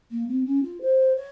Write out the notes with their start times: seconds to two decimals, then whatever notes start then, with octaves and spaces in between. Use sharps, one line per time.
0.11 A#3
0.27 C4
0.45 C#4
0.63 F4
0.81 C5
1.15 C#5